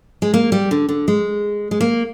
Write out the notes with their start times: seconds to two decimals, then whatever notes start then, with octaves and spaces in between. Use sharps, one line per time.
0.22 G#3
0.34 A#3
0.52 G3
0.71 D3
0.89 D3
1.08 G#3
1.71 G#3
1.81 A#3